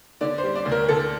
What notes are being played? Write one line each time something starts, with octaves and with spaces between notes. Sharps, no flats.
D3 D5
C5
G3
D5
D2
A#4
D2 A4